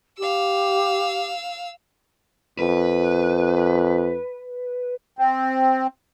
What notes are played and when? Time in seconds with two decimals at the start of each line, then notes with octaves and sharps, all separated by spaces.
0.18 G4 F5 E6
2.59 F2 B4
5.19 C4